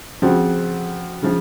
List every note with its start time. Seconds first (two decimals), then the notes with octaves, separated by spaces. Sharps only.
0.22 C#3 F3 C4 F#4
1.22 C#3 F3